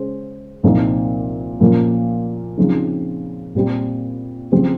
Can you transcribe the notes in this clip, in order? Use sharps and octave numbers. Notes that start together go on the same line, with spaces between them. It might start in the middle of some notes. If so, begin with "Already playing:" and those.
Already playing: C#3 G#3 C#4 C5
C2 A#2 F3 C4 D#4
A#2 F3 A#3 C#4
C#3 F3 C4 D#4
A#2 G3 C4 G4
C#3 F3 C4 G4